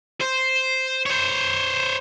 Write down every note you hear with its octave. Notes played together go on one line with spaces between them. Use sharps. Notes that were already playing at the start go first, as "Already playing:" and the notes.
C5
C5 C#5